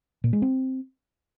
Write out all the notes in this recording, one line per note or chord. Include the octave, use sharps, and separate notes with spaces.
A#2
G#3
C4